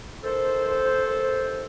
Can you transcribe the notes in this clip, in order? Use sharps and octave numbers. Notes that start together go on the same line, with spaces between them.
D#3 A4 C5
D#2
D#2
D#3